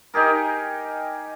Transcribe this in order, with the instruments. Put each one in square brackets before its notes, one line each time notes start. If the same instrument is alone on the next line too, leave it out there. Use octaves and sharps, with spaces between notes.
[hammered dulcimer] D#4 G4 G#4 A#4